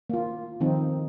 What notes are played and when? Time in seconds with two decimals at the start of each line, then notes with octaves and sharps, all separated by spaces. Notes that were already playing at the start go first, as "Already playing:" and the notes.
0.10 A#3 F4
0.60 D#3 F3 C4 D#4